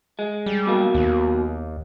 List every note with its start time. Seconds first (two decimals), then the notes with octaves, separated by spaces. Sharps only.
0.19 G#3
0.46 G3
0.66 B2 F#3 A#3
0.94 D#2